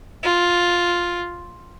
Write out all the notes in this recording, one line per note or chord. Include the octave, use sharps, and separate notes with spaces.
F4